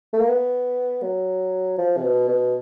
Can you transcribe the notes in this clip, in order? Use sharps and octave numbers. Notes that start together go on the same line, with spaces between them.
A3
A#3
B3
F#3
F3
C3
B2
B2